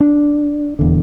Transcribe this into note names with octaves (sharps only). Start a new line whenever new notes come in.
D4
D#1 E2 D3